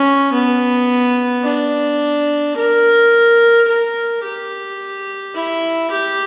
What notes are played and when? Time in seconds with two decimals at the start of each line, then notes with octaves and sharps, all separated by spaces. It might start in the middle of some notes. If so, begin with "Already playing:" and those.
Already playing: C#4
0.33 B3
1.44 D4
2.57 A#4
3.68 A#4
4.24 G4
5.36 E4
5.91 G4